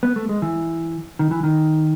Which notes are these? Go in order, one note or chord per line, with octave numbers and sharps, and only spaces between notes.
B3
A3
G#3
E3
D#3
E3
D#3